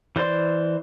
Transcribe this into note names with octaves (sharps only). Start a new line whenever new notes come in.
E3 C5 D5 C6